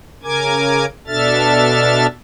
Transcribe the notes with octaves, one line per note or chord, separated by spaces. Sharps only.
C#3 A#4 G#5 D6 G#6
B2 D4 A4 E5 F6 A6